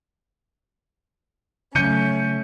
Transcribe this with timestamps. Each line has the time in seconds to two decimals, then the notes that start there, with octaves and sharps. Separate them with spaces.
1.75 C#3 F#3 A3 C#4 G6 C#7 D#7